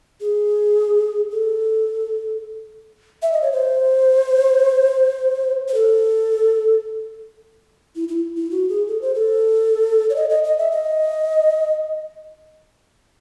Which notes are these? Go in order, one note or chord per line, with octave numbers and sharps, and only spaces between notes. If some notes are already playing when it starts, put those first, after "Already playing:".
G#4
A4
E5
D#5
C#5
C5
C5
A4
E4
E4
E4
F#4
G#4
A4
C5
A4
C#5
D#5
D#5
D#5
E5
D#5